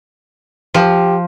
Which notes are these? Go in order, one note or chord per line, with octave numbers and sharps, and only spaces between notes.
F3 G4